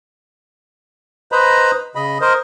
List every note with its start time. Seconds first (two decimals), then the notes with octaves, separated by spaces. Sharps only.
1.32 B4 C5 D#5 A#5 B5
1.95 C#3 D#5 B5
2.21 A#4 C5 D#5